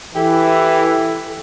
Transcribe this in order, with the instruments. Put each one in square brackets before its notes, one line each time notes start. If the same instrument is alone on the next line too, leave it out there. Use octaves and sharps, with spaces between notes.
[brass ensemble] E3 [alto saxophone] E4 [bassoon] G4 [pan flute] A4